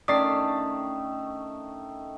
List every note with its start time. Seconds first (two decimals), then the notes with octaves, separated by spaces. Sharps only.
0.08 D#3 A3 C#4 D4 D5 D#6 B6 C7